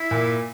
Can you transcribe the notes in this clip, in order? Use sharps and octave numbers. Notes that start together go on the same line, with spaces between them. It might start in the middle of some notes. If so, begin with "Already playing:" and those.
Already playing: E4
A#2